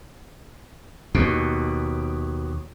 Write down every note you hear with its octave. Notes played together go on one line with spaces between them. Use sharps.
D#2 B2